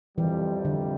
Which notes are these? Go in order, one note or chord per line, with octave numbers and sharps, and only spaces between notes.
F2 C3 E3 G3
D3